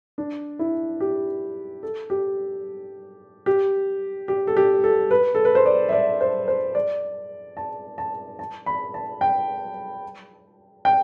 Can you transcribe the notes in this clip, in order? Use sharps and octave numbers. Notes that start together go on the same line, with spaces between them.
D4
E4
G4
A4
G4
G4
G4
A4
G4
A4
B4
A4
B4
C5
D5
E5
D5
C5
C5
D5
A5
A5
A5
B5
A5
G5
G5